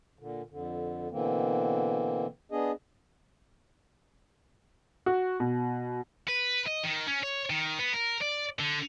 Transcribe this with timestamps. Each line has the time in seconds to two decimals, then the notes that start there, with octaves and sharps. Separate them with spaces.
0.19 A#2 D3
0.50 F2 D3
1.11 B2 D3 E3 A#3 C4
2.52 B3 D4 G#4 D#5
5.06 F#4
5.40 B2
6.29 B4
6.68 D#5
6.85 D#3
7.08 C#4
7.23 C#5
7.50 D#3
7.79 B3
7.93 A#4
8.22 D5
8.59 D3